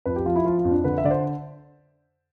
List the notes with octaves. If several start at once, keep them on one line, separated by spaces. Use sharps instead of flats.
F2 B4
G4
F3 F4
E4
F3 F4
F4
F2
D4
D3 B4
E5
D3 D5
C5